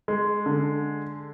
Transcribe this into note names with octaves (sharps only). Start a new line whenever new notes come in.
G#3
D3